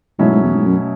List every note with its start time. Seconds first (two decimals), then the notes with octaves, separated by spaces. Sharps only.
0.19 G#2 B2 F#3 A3 C#4 E4
0.32 G#2
0.43 E2
0.55 G#2
0.66 F#2